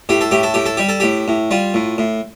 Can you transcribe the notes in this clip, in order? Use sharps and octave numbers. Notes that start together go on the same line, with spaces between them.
A2 G4
A4
A2 G4
A4
A2 G4
A4
G3 G4
A4
A2 G4
A2
G3 F4
A2
A2